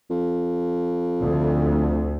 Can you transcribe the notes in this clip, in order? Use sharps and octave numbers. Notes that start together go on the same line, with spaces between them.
F2
D2